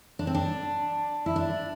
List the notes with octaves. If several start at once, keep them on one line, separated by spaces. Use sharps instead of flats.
D4
C4
D4
E4
D4